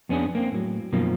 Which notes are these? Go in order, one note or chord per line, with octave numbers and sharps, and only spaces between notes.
F2 B3 C#4 D4 G#4
A#3 C4
A2 F#3
F#2 B2 D#3 F3 A#3